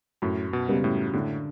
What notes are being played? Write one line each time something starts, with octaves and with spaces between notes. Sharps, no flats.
F#2 A2
B2
C#3 G3 B3
A2
A2 D3